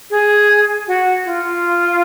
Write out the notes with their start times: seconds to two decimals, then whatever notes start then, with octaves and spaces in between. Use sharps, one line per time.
0.10 G#4
0.87 F#4
1.25 F4